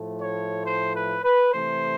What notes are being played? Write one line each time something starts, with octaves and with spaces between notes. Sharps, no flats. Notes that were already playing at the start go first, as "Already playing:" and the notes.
Already playing: A2 F3 A3
C#5
C5
B4
B4
C3 E3 A3 C5